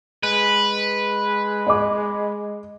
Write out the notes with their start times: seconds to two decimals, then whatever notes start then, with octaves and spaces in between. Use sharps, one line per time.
0.23 G#3 B4
1.67 D#5 D6